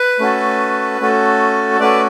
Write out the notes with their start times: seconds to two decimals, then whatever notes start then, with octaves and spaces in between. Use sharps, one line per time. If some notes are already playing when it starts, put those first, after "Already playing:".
Already playing: B4
0.20 A3 C#4 F#4 A4
1.00 A3 C#4 F#4 A4
1.79 A3 C#4 F#4 A4 B4 D5